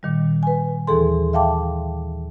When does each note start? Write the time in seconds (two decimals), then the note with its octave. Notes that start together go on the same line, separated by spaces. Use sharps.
0.03 A#2 D#3 G3
0.43 B4 G#5
0.87 D#2 E3 G#4 A4 C6
1.33 E5 F5 G5 A5 D6